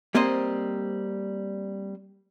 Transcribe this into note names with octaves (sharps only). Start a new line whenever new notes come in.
G3 A#3 C4 C5 D#5